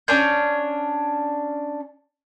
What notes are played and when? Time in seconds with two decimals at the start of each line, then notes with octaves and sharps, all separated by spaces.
0.08 C#4 D4 G6